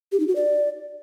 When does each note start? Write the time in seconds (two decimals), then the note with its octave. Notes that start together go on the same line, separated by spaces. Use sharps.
0.12 G4
0.20 D#4
0.28 F#4
0.36 D5